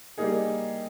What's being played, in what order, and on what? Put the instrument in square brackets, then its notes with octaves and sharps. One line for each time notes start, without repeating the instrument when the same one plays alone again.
[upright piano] G3 A#3 D#4 G#4